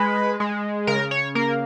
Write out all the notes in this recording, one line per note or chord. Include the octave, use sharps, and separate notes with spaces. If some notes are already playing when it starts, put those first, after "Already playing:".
Already playing: G#3 B4
G#3
C#3 A#4
C#5
A#3 A#4